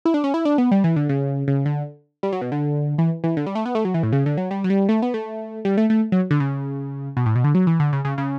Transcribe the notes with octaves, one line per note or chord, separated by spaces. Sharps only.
E4
D4
C#4
E4
D4
B3
G3
E3
D3
C#3
C#3
D3
G3
F#3
B2
D3
E3
E3
D3
G3
A3
B3
A3
F#3
E3
A2
C#3
D3
F#3
G3
F#3
G3
A3
B3
A3
G3
A3
A3
F#3
D3
C#3
B2
A2
B2
D3
F#3
E3
D3
C#3
C#3
C#3